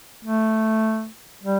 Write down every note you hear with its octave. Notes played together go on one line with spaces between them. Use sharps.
A3
G3